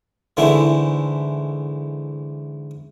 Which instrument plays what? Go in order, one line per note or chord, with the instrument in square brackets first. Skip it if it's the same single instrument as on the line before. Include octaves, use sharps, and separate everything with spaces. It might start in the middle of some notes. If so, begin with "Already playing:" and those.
[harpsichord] G#2 D3 E3 G#3 A3 E4